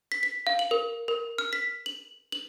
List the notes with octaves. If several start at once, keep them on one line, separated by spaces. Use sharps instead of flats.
B6
B6
F5
F#7
A#4
A#4
F6
B6
F#7
F#7